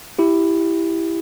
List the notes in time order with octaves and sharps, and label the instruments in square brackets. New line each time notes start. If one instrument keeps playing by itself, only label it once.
[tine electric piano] E4 G4